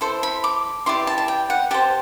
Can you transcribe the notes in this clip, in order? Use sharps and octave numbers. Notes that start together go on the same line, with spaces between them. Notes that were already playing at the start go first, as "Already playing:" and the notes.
E4 A4 C5 C6
B5
D6
E4 G4 B4 D5 C6
A5
A5
G5
F#5
G4 C5 A5